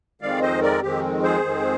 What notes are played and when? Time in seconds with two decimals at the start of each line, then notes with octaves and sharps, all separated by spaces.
0.22 F2 D#3 G#3 C4 D5 F5
0.42 C5 D#5
0.62 A#4 D5
0.82 F2 D#3 G#3 C4 G4
1.23 G#4 C5
1.43 F2 D#3 G#3 C4